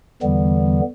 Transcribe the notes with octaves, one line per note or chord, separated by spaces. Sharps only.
E2 D3 E3 G3 B3